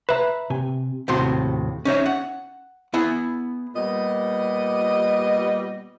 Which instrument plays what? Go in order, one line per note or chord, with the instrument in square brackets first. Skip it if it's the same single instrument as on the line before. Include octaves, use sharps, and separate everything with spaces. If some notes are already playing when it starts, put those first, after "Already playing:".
[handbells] B4 E5 [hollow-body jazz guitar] A#5 B5
[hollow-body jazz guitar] C3 G#5
D#2 A2 C3 F#4 C6
C#4 D#4 C#5 E5
F#5
B3 E4 G#4
[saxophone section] A#2 G3 B3 D#5